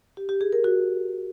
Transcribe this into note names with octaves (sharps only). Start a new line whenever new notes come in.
G4
G4
G#4
A#4
F#4